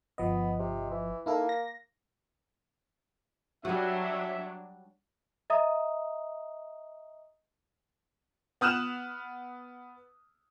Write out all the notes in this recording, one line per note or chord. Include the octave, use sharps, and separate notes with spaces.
G1 F3 B3 D#5
C3
E3
A#3 D#4 E4 A4
A#6
F#3 G3 D4 F#4 E5
D#5 E5 A#5 D#6
B3 D#6 F6 F#6 E7